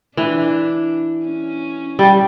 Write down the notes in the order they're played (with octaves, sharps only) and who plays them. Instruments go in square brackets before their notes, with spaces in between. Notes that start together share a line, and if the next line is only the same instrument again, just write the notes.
[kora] E3 [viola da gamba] D4
[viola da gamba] C#4
[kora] G3